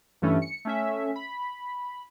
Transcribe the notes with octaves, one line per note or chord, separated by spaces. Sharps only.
G2 E3 A3 C#4
C#7
A3 C#4 E5
B5